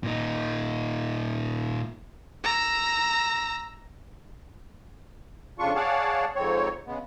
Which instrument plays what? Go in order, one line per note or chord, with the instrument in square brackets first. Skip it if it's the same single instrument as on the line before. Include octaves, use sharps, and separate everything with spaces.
[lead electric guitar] A#2 D#4
[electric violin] A#5 E6
[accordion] F2 C#3 D4 F4 C#6
G#4 C#5 D5 F5 F#5 A5
F2 G#2 C4 C#5
C#3 G#3 B3